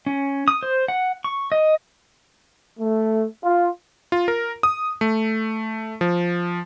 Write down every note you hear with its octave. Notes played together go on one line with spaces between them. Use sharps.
C#4
D#6
C5
F#5
C#6
D#5
A3
F4
F4
A#4
D#6
A3
F3